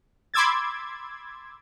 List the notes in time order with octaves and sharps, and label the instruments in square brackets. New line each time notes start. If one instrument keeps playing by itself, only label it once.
[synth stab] B5 C6 D6 E6 G#6 A6